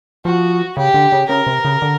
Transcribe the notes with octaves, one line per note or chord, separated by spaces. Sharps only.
F3 F#4
C#3 G4
D3
C#3
C#3 A#4
C3
C#3
D3